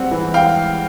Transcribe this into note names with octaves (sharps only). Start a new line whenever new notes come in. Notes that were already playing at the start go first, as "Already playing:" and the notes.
Already playing: G#2 G3 C4 F#5
E3
F5 G5